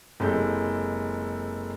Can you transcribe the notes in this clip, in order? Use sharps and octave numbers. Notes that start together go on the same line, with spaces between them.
F#1 C3 G#3 A4 G6